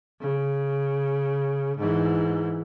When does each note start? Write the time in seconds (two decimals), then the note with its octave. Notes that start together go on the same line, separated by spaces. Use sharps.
0.21 C#3
1.77 G#2 E3